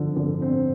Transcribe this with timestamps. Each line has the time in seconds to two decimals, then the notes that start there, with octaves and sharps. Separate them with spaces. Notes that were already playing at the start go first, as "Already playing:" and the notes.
Already playing: D3 F3
0.16 D3
0.42 C4